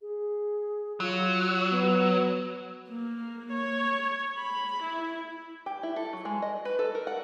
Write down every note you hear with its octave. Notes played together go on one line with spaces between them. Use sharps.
G#4
F#3 F4
B3
A#3
C#5
B5
E4
G4
E4
A4
F#3
G#3
D#5
B4
A4
A#4
F#5